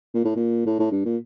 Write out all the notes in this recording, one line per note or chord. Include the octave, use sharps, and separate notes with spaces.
A#2
A2
A#2
A2
A2
G2
A#2